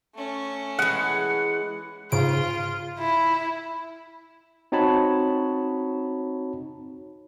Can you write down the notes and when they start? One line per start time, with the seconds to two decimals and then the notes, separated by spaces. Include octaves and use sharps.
0.15 A3 C#4
0.79 E3 G#3 F#5
2.12 G#2 C#3 F4 D7
2.99 E4
4.72 C4 D#4 F#4 C#5 A5 B5